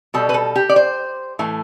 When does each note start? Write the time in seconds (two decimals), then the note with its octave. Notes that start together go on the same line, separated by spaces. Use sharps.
0.14 B2 G3 A4
0.29 B4
0.34 A4
0.56 G4
0.69 D5
0.76 C5
1.39 A2 E3 A3